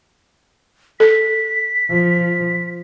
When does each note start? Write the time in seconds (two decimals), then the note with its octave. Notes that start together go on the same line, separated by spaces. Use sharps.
1.00 A4 B6
1.90 F3